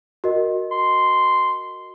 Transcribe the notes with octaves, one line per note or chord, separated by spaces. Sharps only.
F#4 A#4 D#5
C6